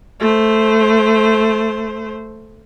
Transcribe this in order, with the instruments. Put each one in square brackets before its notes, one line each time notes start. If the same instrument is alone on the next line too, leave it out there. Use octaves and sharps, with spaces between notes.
[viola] A3 C5